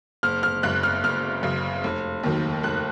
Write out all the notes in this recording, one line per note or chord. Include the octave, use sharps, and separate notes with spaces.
F#1 F6
F6
F#2 C#3 F#6
F6
F#1 F6
F#2 C#3
F1
D#2 D#3 F#3
F1 F#6